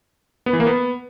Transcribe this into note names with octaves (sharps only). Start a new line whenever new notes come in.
B3
E3
A#3
B3